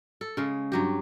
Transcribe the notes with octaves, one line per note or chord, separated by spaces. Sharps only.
A4
C#3 G#3
G2 F#3 G4